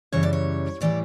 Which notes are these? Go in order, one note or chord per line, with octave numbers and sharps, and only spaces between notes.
F#2 C#3 E3 G3 C#5
D5
C#5
A2 E3 G3 D5